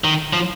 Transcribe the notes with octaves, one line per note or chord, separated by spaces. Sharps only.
D#3
F3